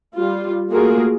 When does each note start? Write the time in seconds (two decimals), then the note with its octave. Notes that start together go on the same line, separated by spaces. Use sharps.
0.15 G3 F4
0.71 A3 A#3 F4 F#4 G#4 A#4